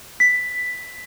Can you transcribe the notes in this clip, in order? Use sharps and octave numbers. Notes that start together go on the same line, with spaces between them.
B6